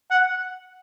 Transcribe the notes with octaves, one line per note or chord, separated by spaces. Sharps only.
F#5